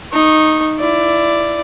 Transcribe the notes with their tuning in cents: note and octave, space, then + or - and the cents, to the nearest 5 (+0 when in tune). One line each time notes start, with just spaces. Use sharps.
D#4 +0 C#6 -20
E4 +20 D5 +0